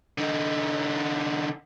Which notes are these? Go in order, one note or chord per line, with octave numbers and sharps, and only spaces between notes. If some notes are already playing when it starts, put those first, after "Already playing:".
D3 D#4